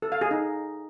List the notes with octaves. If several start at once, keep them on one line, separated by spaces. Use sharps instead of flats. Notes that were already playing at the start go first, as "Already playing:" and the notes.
A4
F5
G#4
D#4